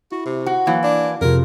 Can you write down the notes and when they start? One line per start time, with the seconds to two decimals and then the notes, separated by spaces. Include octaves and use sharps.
0.12 E4 F#4
0.26 C3
0.46 F#4
0.67 E3 F#3 A#3 F5
0.84 D4
1.21 F2 C3 F4 G#4 A#4